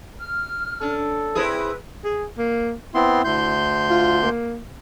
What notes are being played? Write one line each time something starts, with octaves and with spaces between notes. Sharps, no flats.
F6
C#4 D4 A4
C4 E4 G#4 B4
G#4
A#3
B3 C4 E4 C6
D2 C6 G6
F4
A#3